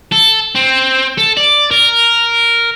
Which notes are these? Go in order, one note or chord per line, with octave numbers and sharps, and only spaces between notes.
A4
C4
A4
D5
A#4